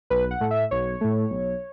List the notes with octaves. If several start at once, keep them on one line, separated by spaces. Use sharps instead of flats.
B1 B4
F#5
A2 A3
E5
B1 C#5
A2 A3
B1